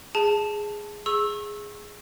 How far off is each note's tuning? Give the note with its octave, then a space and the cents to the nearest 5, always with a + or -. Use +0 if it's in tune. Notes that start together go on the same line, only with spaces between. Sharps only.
G#4 +0 A5 +0
G#4 +0 C#6 -30 E6 -5